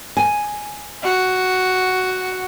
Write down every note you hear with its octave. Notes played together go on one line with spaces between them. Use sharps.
G#5
F#4